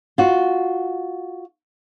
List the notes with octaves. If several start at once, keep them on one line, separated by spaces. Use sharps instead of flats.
F4 F#4